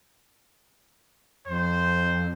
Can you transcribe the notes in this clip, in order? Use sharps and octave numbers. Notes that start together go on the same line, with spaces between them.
F2 C5